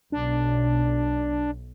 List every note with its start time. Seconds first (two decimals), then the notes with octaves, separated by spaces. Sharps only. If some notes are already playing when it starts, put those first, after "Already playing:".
0.12 B1 D4